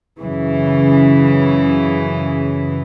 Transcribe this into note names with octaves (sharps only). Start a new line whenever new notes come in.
F#2 C#3 E3